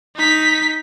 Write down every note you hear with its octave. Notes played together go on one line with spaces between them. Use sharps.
D#4 B6